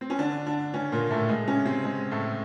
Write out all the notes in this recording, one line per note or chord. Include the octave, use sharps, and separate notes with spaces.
C4
C#4
D3 D4
D3 D4
C#3 C#4
A#2 A#3
A2 A3
G#3
C#3 C#4
C3 C4
G#3
A2 A3